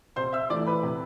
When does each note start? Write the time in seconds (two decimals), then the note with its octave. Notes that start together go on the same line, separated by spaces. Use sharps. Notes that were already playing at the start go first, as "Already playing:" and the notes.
0.16 C3 C5 C6
0.33 E5 E6
0.50 E3 A3 D5 D6
0.66 B4 B5
0.83 C3